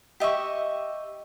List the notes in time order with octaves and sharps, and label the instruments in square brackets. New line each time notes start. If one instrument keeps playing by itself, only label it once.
[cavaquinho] G4 D#5 E5 C#6